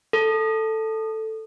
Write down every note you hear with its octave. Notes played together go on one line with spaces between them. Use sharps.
A4